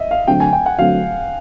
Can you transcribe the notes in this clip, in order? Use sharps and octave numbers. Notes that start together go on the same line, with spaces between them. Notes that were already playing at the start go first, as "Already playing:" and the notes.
Already playing: D#5 E5
F5
D3 F#3 A3 C4 G5
G#5
G5
F#5
D3 F#3 A3 C4 F5